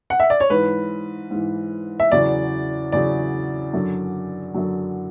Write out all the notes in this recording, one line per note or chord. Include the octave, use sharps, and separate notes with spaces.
F#5
E5
D5
C#5
G#2 E3 B4
G#2 E3
E5
E2 C#3 F#3 D5
E2 C#3 F#3 D5
F#2 D3 F#3
F#2 D3 F#3